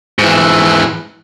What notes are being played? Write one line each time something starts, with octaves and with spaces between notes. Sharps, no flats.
G#2 E3